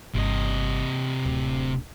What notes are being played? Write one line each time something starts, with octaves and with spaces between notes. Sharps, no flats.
G1 C3 D#5
D1